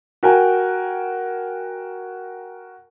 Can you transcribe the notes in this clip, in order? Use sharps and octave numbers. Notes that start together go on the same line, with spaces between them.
F#4 A#4 G5 G#5